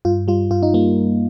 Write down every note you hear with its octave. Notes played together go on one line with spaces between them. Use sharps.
G2 F4
G3 F4
G2 F4
D#4
G3 A#3